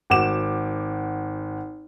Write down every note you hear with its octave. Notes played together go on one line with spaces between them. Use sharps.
G#1 F#4 D6 E7